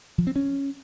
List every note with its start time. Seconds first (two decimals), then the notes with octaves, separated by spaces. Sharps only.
0.18 F3
0.27 C4
0.36 C#4